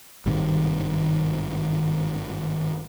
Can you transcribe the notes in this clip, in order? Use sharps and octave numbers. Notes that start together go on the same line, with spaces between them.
G#1 G2 C3 D#3